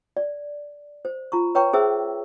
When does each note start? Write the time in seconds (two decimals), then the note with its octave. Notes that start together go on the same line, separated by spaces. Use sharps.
0.17 D5
1.05 C5
1.32 F4 A#5 C#6
1.55 B4 C#5 G5 A#5 C#6
1.73 C#4 G#4 C5 E5 E6